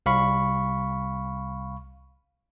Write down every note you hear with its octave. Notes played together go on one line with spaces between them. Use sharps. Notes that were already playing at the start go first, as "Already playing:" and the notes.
C2 F5 B5 C#6